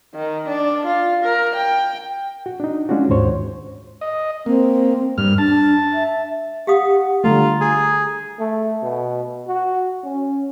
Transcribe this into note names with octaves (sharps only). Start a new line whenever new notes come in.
D#3
D4
F4
A#4
G5
F#4
D4 D#4
G#3 C#4 D4 F4 F#4
D#2 G#2 C5 C#5
D#5
A#3 C4
G2 F6
D4 A5
E5
G4 F5 F#5 D#6
D3 G3 A3 F4 A#5
G#4
A3
B2
F#4
C#4